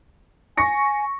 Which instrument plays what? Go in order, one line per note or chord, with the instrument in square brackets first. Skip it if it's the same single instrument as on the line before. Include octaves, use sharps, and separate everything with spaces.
[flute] G#5 [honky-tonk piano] C#6 A#6 C#7